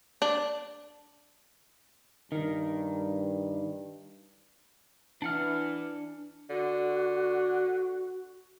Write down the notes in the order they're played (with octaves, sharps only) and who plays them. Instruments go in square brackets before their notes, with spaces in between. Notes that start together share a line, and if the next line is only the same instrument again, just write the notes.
[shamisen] D4
[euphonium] G2 [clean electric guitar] D#3
[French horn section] E3 [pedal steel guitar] D4 F#5 F6
[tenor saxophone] D3 [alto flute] F#4